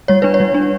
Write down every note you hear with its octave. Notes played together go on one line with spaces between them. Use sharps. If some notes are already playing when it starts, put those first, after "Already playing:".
G3 C#5
D4 B4
C#5
G3
D4